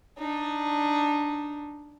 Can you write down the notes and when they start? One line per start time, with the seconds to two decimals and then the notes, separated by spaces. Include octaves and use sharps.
0.18 D4 D#4